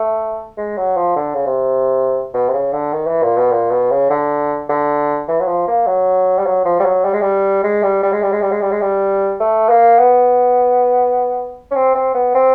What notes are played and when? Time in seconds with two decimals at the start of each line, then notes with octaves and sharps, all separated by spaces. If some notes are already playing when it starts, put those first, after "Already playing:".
Already playing: A3
0.57 G#3
0.77 F#3
0.97 F3
1.16 D3
1.34 C#3
1.46 C3
2.34 B2
2.49 C3
2.53 C#3
2.73 D3
2.93 D#3
3.07 E3
3.23 A#2
3.37 B2
3.52 A#2
3.71 B2
3.90 C#3
4.10 D3
4.69 D3
5.28 E3
5.40 F#3
5.48 F3
5.68 A#3
5.87 F#3
6.39 G3
6.46 F#3
6.65 F3
6.80 G3
6.85 F#3
7.05 G3
7.13 G#3
7.22 G3
7.63 G#3
7.83 G3
8.03 G3
8.12 G#3
8.23 G3
8.33 G#3
8.42 G3
8.52 G#3
8.62 G3
8.71 G#3
8.82 G3
9.40 A3
9.69 A#3
9.99 B3
11.71 C#4
11.76 C4
11.95 C4
12.14 B3
12.34 C4